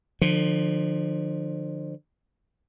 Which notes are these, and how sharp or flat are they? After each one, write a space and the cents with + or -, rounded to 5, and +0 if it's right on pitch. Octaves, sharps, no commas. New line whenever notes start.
D3 +40 F3 +15